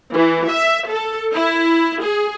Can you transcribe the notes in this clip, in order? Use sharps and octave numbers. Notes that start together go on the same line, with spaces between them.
E3
E5
A4
E4
G#4